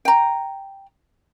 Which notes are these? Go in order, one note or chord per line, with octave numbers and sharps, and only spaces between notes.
G5 A#5